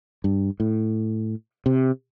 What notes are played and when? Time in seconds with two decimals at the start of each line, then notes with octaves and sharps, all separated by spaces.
0.24 G2
0.60 A2
1.66 C3